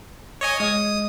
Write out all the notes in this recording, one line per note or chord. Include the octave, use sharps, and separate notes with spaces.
C#5 D#5 G#5
G#3 D#5 D#6